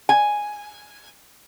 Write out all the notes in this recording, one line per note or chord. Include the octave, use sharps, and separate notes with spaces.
G#5